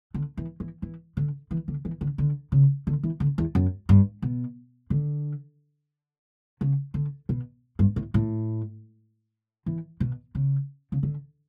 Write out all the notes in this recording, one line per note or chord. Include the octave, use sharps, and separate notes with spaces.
D3
E3
E3
E3
D3
E3
D3
E3
D3
D3
C#3
D3
E3
D3
E2
F#2
G2
B2
D3
C#3
D3
B2
G2
A2
A2
E3
B2
C#3
C#3
D3